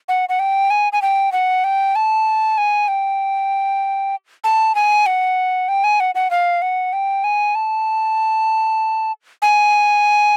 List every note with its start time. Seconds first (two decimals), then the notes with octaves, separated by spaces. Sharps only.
0.09 F#5
0.29 F#5
0.39 G5
0.70 G#5
0.93 G#5
1.02 G5
1.32 F#5
1.64 G5
1.96 A5
2.58 G#5
2.88 G5
4.44 A5
4.75 G#5
5.06 F#5
5.68 G5
5.84 G#5
6.00 F#5
6.15 F#5
6.31 F5
6.62 F#5
6.93 G5
7.24 G#5
7.55 A5
9.42 G#5